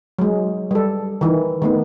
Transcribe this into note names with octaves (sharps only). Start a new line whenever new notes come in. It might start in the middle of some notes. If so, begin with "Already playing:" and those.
F#3 G#3
G3 A4
D#3 E3
D#3 A3 B3